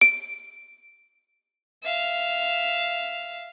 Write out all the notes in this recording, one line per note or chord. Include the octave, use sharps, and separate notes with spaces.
D7
E5 F5